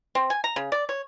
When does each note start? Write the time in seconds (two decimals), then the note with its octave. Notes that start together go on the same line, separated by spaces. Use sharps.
0.15 C4
0.30 G#5
0.44 A#5
0.56 C#3
0.72 D5
0.89 C#5